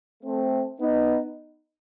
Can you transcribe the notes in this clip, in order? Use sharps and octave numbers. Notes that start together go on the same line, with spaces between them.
A3 C4
B3 D#4